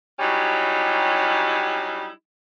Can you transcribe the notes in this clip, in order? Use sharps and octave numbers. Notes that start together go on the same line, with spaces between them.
F#3 G3 C#4 D#4 E4 G4